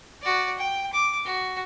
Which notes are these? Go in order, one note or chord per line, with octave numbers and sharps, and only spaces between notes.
F#4 D5
G5
D6
F#4